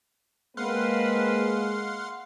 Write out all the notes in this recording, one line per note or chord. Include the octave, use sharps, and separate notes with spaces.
G#3 A#3 C4 B4 F5 F#5 C6